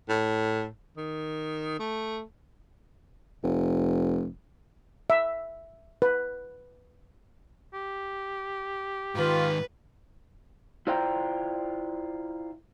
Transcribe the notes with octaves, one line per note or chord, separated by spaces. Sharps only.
A2
D#3
A3
F1
E5
B4
G4
G#2 D#3 F4 B4
E4 F4 C5 D5 G5 A#5